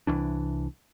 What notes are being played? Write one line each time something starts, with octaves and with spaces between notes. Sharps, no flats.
C2 E3 D4